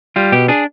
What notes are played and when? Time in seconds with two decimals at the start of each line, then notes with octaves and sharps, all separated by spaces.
0.16 G3 F4
0.32 B2 G4
0.48 D4 G#4